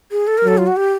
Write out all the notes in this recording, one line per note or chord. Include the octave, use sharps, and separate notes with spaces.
G#4
A4
A#4
F#3 A4
F4
F#4
G4